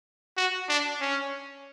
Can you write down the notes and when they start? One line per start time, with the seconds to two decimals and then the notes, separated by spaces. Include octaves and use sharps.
0.37 F#4
0.69 D4
1.01 C#4